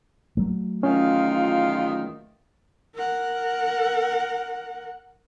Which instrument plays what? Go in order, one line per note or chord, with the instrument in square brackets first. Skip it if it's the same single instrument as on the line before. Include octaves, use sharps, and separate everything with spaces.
[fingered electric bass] F#3 A3
[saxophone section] E2 D#3 F4 [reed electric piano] C#4
[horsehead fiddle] A#4 F#5